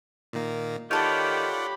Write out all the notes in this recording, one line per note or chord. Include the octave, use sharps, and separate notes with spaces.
A#2 D#3 A#3
D#3 F4 G4 A4 C#5 D5 F#5 B5